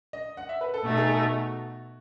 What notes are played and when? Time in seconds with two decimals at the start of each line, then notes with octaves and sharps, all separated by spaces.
0.13 D#5
0.37 F#5
0.49 E5
0.61 B4
0.74 A4
0.85 B2 A3 D#4 F#4
0.97 G#4
1.09 A4
1.21 F#4